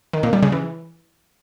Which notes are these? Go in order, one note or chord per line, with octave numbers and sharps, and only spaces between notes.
D#3
A#2
G3
C#3
E3